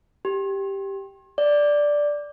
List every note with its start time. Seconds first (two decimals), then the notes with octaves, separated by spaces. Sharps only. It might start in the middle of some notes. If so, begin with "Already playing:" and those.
0.25 G4
1.38 D5